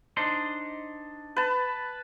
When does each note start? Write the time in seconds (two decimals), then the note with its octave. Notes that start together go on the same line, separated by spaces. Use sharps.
0.17 D4 D#4 C5
1.36 B4 A5